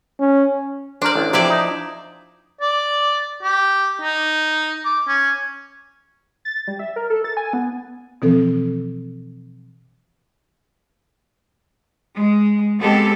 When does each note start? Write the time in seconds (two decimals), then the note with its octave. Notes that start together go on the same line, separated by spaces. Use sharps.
0.20 C#4
1.02 D4 A#4 C5 D5
1.16 A1
1.33 C3 F3 E4 D5
1.50 D#4
2.61 D5
3.43 G4
4.02 D#4
4.85 D6
5.08 C#4
6.45 A6
6.67 G3
6.79 E5
6.96 A#4
7.10 A4
7.24 A6
7.37 G#5
7.53 B3
8.22 B2 E3 F3 C4 A4
12.16 G#3
12.78 G#3 B3 C4 G4 A4